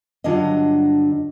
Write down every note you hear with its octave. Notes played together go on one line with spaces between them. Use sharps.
G2 D3 F#3 D4 F4 D#5